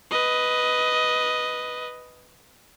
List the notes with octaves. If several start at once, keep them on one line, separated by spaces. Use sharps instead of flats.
B4 D#5